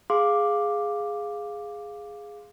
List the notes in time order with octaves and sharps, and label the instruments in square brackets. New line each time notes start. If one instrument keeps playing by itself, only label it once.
[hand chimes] G#4 F5 C6 D6